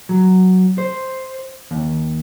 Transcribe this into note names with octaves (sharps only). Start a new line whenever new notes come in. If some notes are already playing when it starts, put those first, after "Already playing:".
F#3
C5
D#2